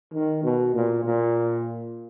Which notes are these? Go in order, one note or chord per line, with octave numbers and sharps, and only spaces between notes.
D#3
B2
A#2
A#2